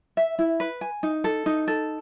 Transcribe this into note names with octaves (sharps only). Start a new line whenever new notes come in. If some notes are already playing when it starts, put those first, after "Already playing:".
E5
E4
B4
G#5
D#4
A4
D#4
A4